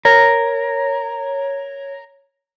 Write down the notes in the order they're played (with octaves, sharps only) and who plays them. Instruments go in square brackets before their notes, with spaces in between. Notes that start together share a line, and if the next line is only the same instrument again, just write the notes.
[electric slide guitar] A#4 [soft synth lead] C#5